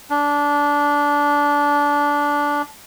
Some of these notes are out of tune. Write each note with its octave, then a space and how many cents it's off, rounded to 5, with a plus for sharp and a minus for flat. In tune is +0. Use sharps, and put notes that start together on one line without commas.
D4 -20